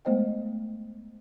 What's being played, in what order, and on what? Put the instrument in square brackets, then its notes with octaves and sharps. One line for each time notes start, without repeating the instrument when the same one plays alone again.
[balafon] G#3 A3 B3 C5 D#5 G5